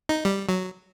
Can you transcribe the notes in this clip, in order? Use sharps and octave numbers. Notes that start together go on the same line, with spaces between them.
D#4
G3
F#3